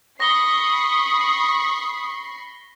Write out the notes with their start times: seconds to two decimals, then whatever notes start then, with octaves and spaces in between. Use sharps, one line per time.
0.20 B5 C#6 D#6 A#6 C7 G7